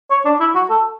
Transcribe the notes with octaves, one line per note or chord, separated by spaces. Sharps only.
C#5
D4
E4
F#4
A4